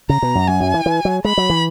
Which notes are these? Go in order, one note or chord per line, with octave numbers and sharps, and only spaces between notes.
C#3 A#5
B2
F#2
F#2 G#5
F#2
E3
E3
F#3
G#3 B5
F#3
E3